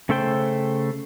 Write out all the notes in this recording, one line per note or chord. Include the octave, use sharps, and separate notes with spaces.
C#3 A3 A4 C5 G5